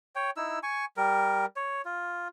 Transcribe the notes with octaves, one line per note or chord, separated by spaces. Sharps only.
C#5 G5
D#4 E4 E6
G#5 C#6
G3 A#4
C#5
F4